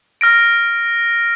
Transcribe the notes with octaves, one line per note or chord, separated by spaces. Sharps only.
F6 A#6 D7